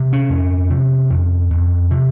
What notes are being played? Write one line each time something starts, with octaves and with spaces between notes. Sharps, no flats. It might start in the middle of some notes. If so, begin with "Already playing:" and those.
Already playing: C3
C#4
F2
C3
F2
F2
C3